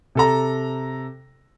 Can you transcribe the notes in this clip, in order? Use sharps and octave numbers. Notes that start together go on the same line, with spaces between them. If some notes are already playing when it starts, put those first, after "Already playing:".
C3 A4 A#5